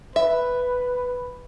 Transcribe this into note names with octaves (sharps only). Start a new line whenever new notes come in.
B4 E5